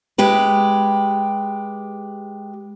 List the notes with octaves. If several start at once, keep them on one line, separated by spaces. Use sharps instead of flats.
G#3 G4 B4